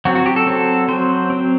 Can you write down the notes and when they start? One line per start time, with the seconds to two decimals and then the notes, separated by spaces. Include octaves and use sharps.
0.05 F#3 C4 F#4
0.15 F#4
0.26 G4
0.36 A4
0.47 F#3 C4
0.88 F#3 C4 C5
1.30 F#3 C4